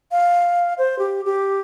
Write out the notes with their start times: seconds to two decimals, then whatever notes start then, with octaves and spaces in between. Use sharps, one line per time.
0.12 F5
0.78 C5
0.99 G4
1.25 G4